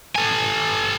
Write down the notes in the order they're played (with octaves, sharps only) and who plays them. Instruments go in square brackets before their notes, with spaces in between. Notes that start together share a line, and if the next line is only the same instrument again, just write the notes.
[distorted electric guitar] A4 G#5